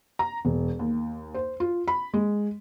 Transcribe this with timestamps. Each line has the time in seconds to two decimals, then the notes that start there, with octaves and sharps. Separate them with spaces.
0.19 A#5
0.45 E1
0.79 D#2
1.34 C5
1.60 F4
1.88 B5
2.14 G#3